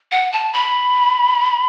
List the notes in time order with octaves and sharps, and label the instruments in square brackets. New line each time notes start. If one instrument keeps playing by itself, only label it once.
[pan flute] F#5
A5
B5